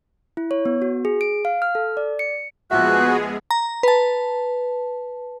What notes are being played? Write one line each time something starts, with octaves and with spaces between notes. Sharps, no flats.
E4
C#5
B3
F#4
G#4
D7
F5
F6
A4
D5
C#7
A#1 F3 G#3 B3 F#4 G#4 E5 F#6
A#5
B4 A5